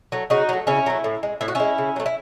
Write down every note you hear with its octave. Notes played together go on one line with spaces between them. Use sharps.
F#3 A3
C#3 D#4 F#4
F#3 A3
C#3 C#4 E4
F#3 A3
A2
G#3
A2 E4
F#4
G#3 C#4 E4
C#3
F#3 A3
E4